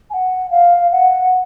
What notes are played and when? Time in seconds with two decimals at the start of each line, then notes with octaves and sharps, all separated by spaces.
0.10 G#5
0.13 F#5
0.50 F5
0.91 F#5